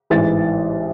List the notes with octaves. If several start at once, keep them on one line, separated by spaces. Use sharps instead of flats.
A1 G#2 E3 A6